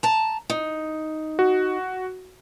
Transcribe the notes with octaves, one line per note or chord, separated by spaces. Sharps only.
A5 A#5
D#4
F#4